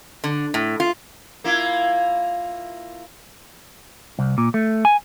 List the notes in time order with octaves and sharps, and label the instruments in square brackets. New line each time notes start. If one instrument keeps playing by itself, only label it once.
[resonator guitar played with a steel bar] D3
A2
F4
[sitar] A#3 E4 F4
[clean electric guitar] C2
A#2
A3
G#5